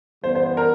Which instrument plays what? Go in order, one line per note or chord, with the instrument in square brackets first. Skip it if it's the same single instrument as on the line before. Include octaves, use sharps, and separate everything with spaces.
[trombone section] E3 G3 B3 [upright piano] C5
[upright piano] C5
C5
A#4